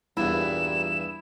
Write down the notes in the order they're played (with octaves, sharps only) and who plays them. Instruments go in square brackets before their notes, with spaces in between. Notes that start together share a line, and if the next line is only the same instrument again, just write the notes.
[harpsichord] E2 G2 [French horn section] A#2 G3 [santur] E4 [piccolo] E7